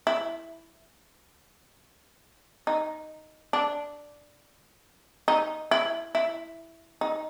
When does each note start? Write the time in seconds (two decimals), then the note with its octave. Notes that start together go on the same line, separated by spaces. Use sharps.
0.07 E4
2.67 D#4
3.53 D4
5.28 D#4
5.71 E4
6.15 E4
7.01 D#4